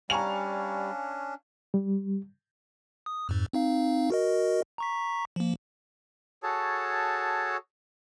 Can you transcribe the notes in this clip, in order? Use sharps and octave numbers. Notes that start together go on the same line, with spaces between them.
G3 C#4 D4 F5 G#5 A#5 C#6 F7
G3
D#6
F2 G#2
C4 D#4 F5
F#4 A#4 D#5
A#5 C#6 B6
F3 A#3
F#4 G#4 A4 C#5 A5